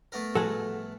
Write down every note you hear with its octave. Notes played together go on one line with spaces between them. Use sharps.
A3 B3 A#4
A2 F3 G3 F#4 G#4 A4 F#5